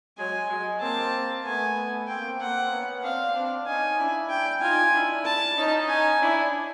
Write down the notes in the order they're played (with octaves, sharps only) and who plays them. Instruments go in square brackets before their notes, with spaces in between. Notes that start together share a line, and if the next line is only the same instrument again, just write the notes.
[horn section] F#3 G#3 [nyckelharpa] G#5
[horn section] F#3 G#3
[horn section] A#3 C4 [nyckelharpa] A5
[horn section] A3 B3 [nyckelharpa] G#5
[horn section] A#3 C4 [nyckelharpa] G5
[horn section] A#3 C4 [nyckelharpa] F#5
[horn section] B3 C#4
[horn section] C4 D4 [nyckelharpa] F5
[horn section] C4 D4
[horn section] C#4 D#4 [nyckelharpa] G#5
[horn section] D4 E4
[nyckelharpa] G5
[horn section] D#4 F4 [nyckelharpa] G#5
[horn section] D4 E4
[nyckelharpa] A5
[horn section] C#4 D#4
[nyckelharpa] G#5
[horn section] D4 E4